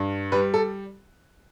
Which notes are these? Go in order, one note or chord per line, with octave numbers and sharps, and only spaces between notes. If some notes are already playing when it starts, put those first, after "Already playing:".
Already playing: G2
G3 B4
A4